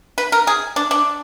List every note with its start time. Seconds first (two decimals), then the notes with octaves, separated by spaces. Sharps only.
0.18 B4
0.32 A#4
0.47 G#4
0.76 D4
0.91 D4